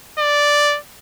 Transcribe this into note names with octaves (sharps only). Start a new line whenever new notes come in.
D5